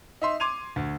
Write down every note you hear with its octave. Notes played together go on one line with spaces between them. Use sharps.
D#4 E5 C6
C6 D6 G#6 D#7 F7
D2